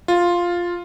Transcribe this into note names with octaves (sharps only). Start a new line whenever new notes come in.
F4